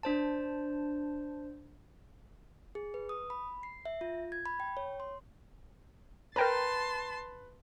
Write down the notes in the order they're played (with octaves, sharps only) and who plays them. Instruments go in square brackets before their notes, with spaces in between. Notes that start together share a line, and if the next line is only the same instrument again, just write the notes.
[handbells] D4 C5 A5
[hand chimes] G#4
B4
D#6
B5
C7
E5
F4
G#6
B5
G5
C#5
C6
[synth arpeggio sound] A#4 G5 A#5 [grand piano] B4 [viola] A5 C6